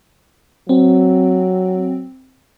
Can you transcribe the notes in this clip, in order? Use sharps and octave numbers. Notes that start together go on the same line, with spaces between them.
F#3 C4